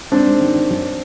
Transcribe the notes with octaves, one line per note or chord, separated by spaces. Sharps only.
G#2 C4 D4
G#2
D#3
D#3
F#2